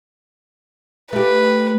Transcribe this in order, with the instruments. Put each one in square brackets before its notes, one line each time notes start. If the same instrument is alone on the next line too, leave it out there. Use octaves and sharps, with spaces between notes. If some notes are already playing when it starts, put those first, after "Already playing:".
[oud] A3 G4 [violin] B4